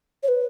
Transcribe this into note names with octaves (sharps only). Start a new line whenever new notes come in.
C#5
B4